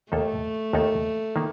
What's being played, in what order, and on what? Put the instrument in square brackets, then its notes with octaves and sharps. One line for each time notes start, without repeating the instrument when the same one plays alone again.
[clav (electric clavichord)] D#2 D#3 A#3 D#4 A4 [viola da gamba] A3
[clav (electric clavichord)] D#2 D#3 A#3 D#4 A4
D#3 A#3